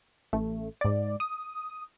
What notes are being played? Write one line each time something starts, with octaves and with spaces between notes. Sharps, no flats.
A1 A3
G#2 D5
D#6